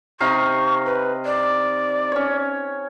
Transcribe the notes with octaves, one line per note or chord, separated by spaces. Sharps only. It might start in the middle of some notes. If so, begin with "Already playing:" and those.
C3 D#4 F5 C#6
B4
D5
C#4 C#5